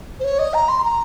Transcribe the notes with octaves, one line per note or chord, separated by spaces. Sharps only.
C5
C#5
D#5
A#5
C6
A#5